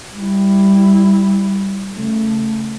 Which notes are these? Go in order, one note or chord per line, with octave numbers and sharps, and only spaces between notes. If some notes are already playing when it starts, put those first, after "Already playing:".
G3 E4
C#3 A3